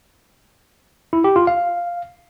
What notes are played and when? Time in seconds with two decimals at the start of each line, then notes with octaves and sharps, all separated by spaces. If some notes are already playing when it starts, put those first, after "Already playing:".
1.13 E4
1.24 G4
1.36 F4
1.47 F5